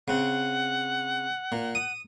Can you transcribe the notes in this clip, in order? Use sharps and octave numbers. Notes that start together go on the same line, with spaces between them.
C#3 C4 F#5
A#2
D#6